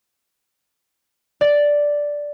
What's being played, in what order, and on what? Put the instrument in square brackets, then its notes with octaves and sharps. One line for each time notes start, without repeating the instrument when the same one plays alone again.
[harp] D5